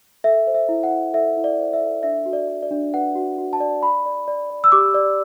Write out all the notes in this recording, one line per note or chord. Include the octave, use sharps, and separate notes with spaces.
A4 E5
C5
E5
E4
F#5
E4
A4 E5
E4
D5
C5
E5
A4
D4 E5
F#4
D5
D5
D5
D4
B4 F#5
F#4
F#4
A5
D5
D5 B5
D5
D5
D5
E6
G4 D6
D5